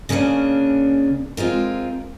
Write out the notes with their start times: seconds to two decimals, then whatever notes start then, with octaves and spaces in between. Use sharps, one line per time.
0.09 C#3 A#3 C#4 D4 G#4
1.37 G#3 C4 F4 A#4